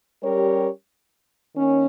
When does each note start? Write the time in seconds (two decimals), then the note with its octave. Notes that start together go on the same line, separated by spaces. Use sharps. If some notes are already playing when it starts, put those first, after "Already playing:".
0.22 G3 C#4 G4 A#4 C#5
1.56 D#3 A#3 C#4